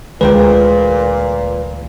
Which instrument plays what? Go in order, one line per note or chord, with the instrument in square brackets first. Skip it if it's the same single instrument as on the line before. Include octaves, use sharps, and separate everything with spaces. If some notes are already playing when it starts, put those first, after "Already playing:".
[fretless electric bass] D2 D3 E3 [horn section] A#2 [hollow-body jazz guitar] G#3 C5 G5 [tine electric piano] B4